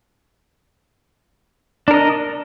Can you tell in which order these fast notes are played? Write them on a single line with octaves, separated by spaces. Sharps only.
D4 A#4 D#5